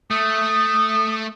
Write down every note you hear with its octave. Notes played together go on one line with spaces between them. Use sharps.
A3 D#6